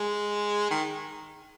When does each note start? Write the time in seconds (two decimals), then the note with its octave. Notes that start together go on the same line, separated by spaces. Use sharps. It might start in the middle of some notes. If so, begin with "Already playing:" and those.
Already playing: G#3
0.71 D#3